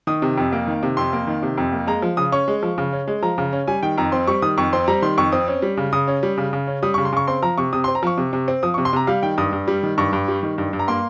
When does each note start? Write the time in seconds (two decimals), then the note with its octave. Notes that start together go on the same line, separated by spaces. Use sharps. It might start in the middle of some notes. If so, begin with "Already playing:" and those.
0.07 D#3 D#6
0.22 C3
0.38 F2
0.53 A#3
0.67 D#3
0.83 C3
0.97 F2 C6
1.13 A#3
1.27 D#3
1.42 C3
1.58 F2
1.72 A#3
1.87 G#3 A#5
2.02 F3
2.17 C#3 D#6
2.32 C#4 C#6
2.48 G#3
2.63 F3
2.78 C#3
2.93 C#4
3.08 G#3
3.23 F3 A#5
3.38 C#3
3.52 C#4
3.68 G3 G#5
3.83 D#3 G5
3.98 F2 A#5
4.12 C4 C6
4.27 G3 C#6
4.42 D#3 D#6
4.58 F2 C#6
4.73 C4 C6
4.88 G3 A#5
5.02 D#3 C6
5.18 F2 C#6
5.32 C4 D#6
5.48 C#4
5.62 G3
5.77 C#3
5.93 C#3 D#6
6.08 C#4
6.23 G3
6.38 C#3
6.53 C#3
6.67 C#4
6.83 G3 D#6
6.94 C#6
6.98 C#3
7.05 C6
7.13 C#3 C#6
7.28 C4 C6
7.42 F3 A#5
7.58 C3 C#6
7.73 C3 D#6
7.84 C6
7.88 C4
7.95 A#5
8.03 F3 C#6
8.17 C3
8.33 C3
8.48 C4
8.63 F3 D#6
8.74 C#6
8.78 C3
8.85 C6
8.93 C3 A#5
9.07 G3 F5
9.23 D#3 G5
9.38 G2 D#6
9.53 G2
9.68 G3
9.83 D#3
9.98 G2 C#6
10.13 G2
10.28 G3
10.43 D#3
10.58 G2
10.73 G2
10.79 A#5
10.88 A#3 C6